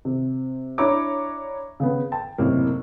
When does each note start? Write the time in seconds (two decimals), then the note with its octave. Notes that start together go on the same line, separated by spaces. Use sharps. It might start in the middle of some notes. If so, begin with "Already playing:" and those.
0.05 C3
0.78 D4 E4 C#5 A#5 D6
1.80 C#3 B3
2.12 G5 A5
2.38 F#1 A2 C3 A#3 A#4